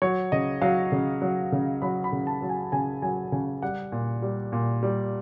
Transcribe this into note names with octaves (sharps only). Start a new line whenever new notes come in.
F#3 C#5
C#3 D#5
F#3 F5
C#3
F#3
C#3
F#3 B5
B5
C#3
A5
F#3
G#5
C#3 G#5
F#3 G#5
C#3 G#5
G3 F#5
A#2
G3
A#2
G3